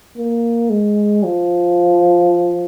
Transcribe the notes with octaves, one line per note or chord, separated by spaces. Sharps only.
A#3
G#3
F3